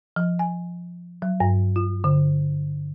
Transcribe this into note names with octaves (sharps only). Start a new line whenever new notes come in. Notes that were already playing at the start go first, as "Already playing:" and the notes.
F3
G#5
F#3
G2
F4
D3